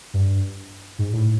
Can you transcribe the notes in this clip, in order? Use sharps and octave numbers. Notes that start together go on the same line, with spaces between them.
G2
G#2
A2